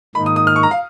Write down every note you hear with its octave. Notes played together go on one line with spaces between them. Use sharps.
G#2 D#3 A#3 D#4 B5
D#6
D#6
F6
C#6
A#5
F5